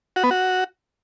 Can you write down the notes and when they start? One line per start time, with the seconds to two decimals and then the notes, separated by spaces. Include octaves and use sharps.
0.16 F#4
0.23 B3
0.31 F#4